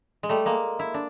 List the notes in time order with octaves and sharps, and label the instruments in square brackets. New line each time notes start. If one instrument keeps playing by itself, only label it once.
[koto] G#3
G3 A3
G#3 A#3
E4
D4